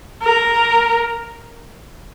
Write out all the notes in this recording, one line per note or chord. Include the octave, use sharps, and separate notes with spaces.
A#4